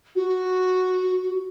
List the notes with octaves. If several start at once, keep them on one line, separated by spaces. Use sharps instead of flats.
F#4